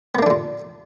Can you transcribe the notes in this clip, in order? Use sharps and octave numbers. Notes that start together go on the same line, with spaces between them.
A#2 D3 A#3 B3 D4